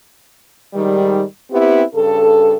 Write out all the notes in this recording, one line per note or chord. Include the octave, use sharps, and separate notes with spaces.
G#2 D#3 G3
B3 C4 E4 G4
G2 C#3 A4